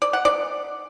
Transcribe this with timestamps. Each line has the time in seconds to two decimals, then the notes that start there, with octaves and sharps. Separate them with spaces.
0.02 D5
0.13 F#5
0.25 D5